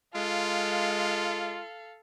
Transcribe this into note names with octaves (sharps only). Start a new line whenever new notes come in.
G#3 F4 A4 F5